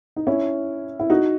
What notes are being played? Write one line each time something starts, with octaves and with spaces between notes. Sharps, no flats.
D#4
C#4 E4
E4
D#4 F#4